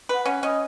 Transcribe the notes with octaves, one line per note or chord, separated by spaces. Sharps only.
B4 F#5
C#4 F#5
C#4 D#5